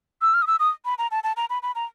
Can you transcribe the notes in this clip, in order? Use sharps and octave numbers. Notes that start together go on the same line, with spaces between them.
E6
F6
D#6
E6
D#6
B5
A#5
A5
A5
A#5
B5
B5
A#5